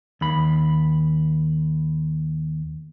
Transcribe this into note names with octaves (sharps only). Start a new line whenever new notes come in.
D#2 B5